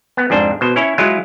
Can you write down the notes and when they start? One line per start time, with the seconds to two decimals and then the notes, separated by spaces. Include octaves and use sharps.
0.17 B3
0.30 F2 G#2 D4 C5
0.61 B2 C5
0.76 C#4 E4 C#5
0.98 F#3 G#3 E4 F4